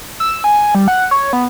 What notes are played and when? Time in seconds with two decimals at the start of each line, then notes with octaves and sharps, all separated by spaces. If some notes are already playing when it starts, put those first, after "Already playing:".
0.20 E6
0.44 G#5
0.75 G3
0.88 F#5
1.11 C#5
1.33 B3